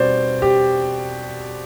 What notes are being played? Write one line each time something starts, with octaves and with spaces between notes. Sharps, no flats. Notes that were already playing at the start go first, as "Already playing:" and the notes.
Already playing: B2 G3 C4 C5 D5
G4